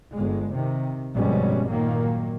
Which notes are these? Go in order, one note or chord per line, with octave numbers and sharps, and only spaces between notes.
G1 G#3
C3 D#3
G1 F2 B2 G3 G#3 C#4
A#2 D#3 F#3 A#3